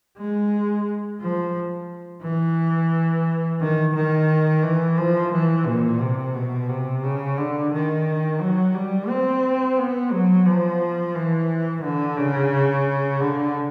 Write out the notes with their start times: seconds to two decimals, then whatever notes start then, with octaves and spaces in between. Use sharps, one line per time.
0.18 G#3
1.21 F3
2.23 E3
3.61 D#3
3.95 D#3
4.63 E3
4.98 F3
5.32 E3
5.66 A#2
6.00 C3
6.34 B2
6.69 C3
7.03 C#3
7.37 D3
7.72 D#3
8.40 F#3
8.75 G3
9.09 C4
9.77 B3
10.12 F#3
10.46 F3
11.15 E3
11.83 D3
12.17 C#3
13.20 D3